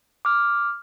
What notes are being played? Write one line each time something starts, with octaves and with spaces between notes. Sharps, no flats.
D6 F6